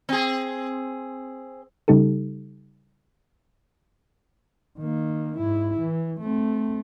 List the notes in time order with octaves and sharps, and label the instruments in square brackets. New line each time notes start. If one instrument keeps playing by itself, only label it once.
[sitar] C4 G#4
[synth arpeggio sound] C#3 G3 D#4 G4 A4
[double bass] D#3 A#3
G#2 E4
E3
A3 C4